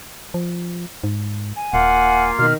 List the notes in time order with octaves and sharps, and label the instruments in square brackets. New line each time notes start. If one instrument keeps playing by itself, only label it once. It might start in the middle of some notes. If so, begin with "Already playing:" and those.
[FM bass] F3
G#2
[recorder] G#5
[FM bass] D#1 [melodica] A#3 F4 F5 [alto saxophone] F#5
[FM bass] B2 [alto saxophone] D#3 [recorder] F6